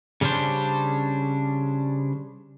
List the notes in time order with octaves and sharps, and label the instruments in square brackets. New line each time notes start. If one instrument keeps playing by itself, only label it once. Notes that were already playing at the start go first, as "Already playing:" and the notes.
[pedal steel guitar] C#3 G3 C#4 D4 C5